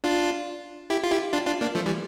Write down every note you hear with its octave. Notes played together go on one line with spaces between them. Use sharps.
D4 F4
E4 G4
F4
E4 G4
D4 F4
D4 F4
A#3 D4
F3 A3
E3 G3